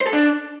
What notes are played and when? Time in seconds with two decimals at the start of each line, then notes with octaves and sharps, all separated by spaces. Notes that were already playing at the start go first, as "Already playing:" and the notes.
0.01 C5
0.07 A4
0.13 D4